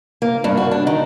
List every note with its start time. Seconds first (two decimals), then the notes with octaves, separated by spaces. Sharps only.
0.22 A#3
0.44 G2
0.57 F#4
0.71 D4
0.87 D#3